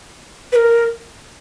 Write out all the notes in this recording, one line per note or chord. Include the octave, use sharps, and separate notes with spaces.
B4
A#4